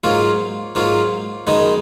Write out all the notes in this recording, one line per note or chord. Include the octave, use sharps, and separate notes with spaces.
G#2 F#3 A#3 F4
G#2 F#3 A#3 F4
F#2 D#3 G#3 B3 D#4